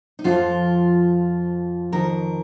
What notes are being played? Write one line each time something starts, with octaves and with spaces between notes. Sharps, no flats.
D#4
F2 F3 F4
F2 D#3 A#4